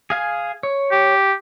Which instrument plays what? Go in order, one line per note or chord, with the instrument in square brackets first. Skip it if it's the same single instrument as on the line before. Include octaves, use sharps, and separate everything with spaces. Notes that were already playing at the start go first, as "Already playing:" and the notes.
[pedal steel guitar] G#4 F5 G#5
C#5
[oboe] G4